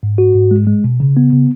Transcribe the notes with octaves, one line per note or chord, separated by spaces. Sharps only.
G#2
F#4
G#2
G#3
G#3
B2
C#3
B3
C#3